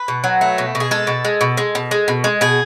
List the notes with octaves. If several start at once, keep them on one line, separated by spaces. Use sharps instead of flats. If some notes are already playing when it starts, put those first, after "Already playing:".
Already playing: B4
B2
F#3
A3
B2
B2
G#4
G#3 A4
B2
G#3
B2
G#3
B2
G#3
B2
G#3
B2 G#4